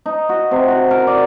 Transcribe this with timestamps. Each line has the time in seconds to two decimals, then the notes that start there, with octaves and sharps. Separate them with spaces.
0.06 D#4
0.29 F#4
0.51 C3
0.68 F#4
0.91 A#4
1.07 D5